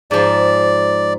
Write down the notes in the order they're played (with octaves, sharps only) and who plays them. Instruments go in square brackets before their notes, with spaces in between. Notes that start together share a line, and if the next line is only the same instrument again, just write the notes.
[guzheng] G#2 F3 [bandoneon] D5